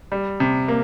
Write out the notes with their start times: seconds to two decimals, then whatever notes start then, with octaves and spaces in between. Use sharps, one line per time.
0.12 G3
0.40 C3
0.68 A#3